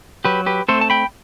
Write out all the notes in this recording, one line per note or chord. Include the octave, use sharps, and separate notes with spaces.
F#3 G4 B4
G4 B4
A3 C4 A4 C5
A5
G5 B5